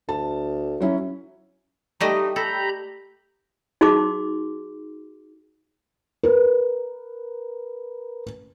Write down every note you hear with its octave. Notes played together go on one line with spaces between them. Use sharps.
D2 A5
F#3 C#4 E4
G3 A3 D#4 G4 D#5
A4 A#5 B5 G6
D#4 F#4 G#4 C6 D6
A#4 B4